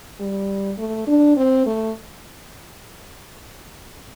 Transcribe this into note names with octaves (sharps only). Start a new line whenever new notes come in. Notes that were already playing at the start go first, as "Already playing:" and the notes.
G3
A3
D4
C4
A3